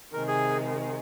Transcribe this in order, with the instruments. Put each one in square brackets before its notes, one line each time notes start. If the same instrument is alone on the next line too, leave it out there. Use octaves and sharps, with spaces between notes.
[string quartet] C3 D#3 G#3 [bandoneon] A#4
[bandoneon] G#4